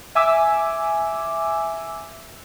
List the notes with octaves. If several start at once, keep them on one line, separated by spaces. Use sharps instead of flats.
E5 G#5 D6 E6